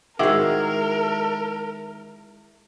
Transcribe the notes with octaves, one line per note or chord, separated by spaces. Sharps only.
D#3 G#3 C4 E4 F#4 G#4 A#4 D6